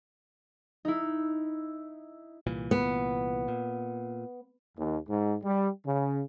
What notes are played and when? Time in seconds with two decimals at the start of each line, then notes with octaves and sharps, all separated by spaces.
0.85 D#4 E4
2.47 C2 A#2 E3
2.71 B3
3.48 A#2
4.77 D#2
5.09 G#2
5.44 G3
5.86 C#3